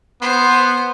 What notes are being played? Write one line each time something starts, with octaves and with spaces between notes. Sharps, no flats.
B3 C5